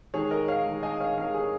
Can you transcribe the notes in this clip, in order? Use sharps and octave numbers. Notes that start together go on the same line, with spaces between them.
D#3 G#3 G#4 C#5
A#4 D#5
C#5 F5
D#3 G#3
D#5 G#5
C#5 F5
D#3 G#3 C#5 F5
G#4 C#5